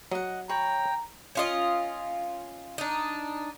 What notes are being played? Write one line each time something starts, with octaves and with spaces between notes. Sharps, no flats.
F#3 D#5 F#5
C#5 G5 A#5 B5
C#4 F4 D#5
D4 D#4